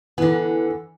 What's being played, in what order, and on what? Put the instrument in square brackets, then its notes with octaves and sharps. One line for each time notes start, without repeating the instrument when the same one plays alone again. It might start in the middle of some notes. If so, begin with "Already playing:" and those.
[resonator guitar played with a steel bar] D3 B3 [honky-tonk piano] E3